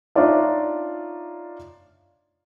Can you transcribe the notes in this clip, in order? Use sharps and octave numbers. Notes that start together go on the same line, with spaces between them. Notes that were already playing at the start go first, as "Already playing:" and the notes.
D4 D#4 F4 C#5 D5 E5